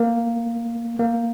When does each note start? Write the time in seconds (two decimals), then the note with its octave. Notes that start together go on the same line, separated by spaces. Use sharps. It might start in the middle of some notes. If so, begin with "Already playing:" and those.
Already playing: A#3
0.99 A#3